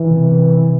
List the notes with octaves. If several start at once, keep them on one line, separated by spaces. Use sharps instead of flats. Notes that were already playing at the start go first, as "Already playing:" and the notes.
Already playing: E3
C3
C3
C3